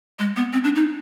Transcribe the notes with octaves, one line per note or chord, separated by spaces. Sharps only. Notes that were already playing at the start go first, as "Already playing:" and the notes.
G#3
B3
C4
D4
D#4